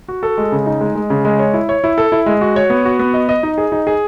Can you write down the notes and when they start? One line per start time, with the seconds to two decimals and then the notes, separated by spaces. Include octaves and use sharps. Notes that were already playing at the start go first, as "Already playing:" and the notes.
0.08 F#4
0.23 A4
0.38 G#3
0.52 C#3
0.66 D#4
0.81 G#3
0.95 G#3
1.10 C#3
1.25 G#3
1.39 C#5
1.54 E4
1.69 C#5
1.84 E4
1.98 A4
2.12 E4
2.26 G#3
2.41 F#4
2.56 C#5
2.70 B3
2.85 F#4
2.99 B3
3.14 D#5
3.29 D#5
3.43 D#4
3.58 G#4
3.72 D#4
3.87 G#4